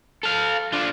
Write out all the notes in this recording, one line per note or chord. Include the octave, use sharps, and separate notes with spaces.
A4 F5
D4 F4